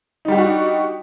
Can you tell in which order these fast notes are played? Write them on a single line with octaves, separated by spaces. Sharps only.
D#4 G3 G4 D4 F#4